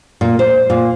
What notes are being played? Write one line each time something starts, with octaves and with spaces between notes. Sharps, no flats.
A#2
C5
A#2